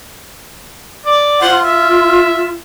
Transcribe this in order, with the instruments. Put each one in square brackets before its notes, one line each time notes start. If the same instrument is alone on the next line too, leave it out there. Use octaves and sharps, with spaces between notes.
[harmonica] D5
[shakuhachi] F4 [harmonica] C5 F#5
[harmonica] E5